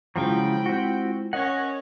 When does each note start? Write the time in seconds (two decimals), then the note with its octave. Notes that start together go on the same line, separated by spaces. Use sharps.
0.16 C#3 F3 F#3 G#3 E4 F4 G5 B5
0.66 C4 F#4
1.33 C#4 A#4 C#5 D#5 F#5